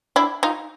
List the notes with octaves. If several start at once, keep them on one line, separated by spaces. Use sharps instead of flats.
D4 E4
D#4 F4